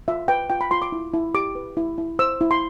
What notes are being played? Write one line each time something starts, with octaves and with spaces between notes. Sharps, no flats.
F4 E5
B4 G5
F4 G5
B5
F4 C6
D6
E4
E4
G4 D6
B4
E4
E4
C5 E6
E4
C6